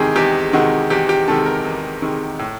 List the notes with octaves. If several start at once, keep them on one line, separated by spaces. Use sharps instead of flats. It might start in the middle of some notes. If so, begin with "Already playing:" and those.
Already playing: E2 C3 D#3 G#3 G4 G#4
E2 G4
C3 D#3 G#3 F#4
E2 G4
G4
C3 D#3 G#3 A4
A#4
E2
C3 D#3 G#3
A2